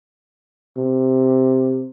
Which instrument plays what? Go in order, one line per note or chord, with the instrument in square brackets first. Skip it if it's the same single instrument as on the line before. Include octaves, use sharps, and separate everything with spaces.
[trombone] C3